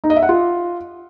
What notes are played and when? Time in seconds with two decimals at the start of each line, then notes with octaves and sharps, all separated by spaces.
0.04 D#4
0.10 D#5
0.16 E5
0.23 F#5
0.29 F4